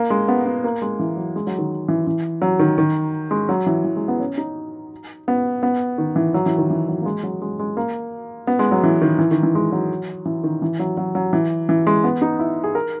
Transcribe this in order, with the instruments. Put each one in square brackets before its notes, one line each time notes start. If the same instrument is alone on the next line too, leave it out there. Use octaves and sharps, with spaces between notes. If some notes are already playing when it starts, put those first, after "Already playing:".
Already playing: [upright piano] A#3
G#3
B3
B3
A#3
G#3
E3
F#3
G#3
F#3
D#3
E3
E3
F#3
D#3
D#3
G#3
F#3
E3
E3
G#3
B3
C#4
D#4
B3
B3
D#3
E3
F#3
E3
D#3
E3
F#3
A#3
G#3
F#3
G#3
G#3
A#3
B3
G#3
F#3
E3
D#3
E3
D#3
E3
G#3
F#3
E3
D#3
E3
F#3
F#3
F#3
E3
E3
G#3
B3
D#4
E4
G#4
A#4